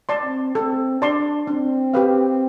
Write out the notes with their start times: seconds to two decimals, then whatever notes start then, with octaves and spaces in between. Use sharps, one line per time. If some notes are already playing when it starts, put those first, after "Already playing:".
0.09 D5 A5 C6
0.24 C4
0.55 C4 A4
1.01 D4 D5 A5 C6
1.47 C4 D4
1.94 G4 B4 F5